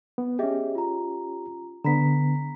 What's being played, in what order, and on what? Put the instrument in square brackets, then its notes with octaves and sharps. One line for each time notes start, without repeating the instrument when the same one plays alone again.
[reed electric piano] B3
[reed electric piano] C#4 G4 [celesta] G#4 D#5 E5
[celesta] F4 A#5
[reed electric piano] D3 B3 [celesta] A#5 B5 B6